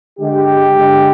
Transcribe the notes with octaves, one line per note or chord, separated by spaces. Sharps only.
D3 G#3 G4
D3 G#3